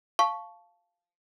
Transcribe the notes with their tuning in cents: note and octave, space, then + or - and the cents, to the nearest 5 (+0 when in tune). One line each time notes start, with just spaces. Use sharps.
F5 +0 A5 -10 C#6 +0